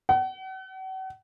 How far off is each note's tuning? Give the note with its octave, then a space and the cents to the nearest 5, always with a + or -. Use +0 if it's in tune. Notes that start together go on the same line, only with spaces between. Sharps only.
F#5 +40